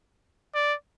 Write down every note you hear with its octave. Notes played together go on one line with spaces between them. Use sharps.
D5